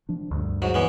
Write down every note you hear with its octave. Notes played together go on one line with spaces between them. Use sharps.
F3 D4
D2 G2
G#2 F#3
E3 B3 C#4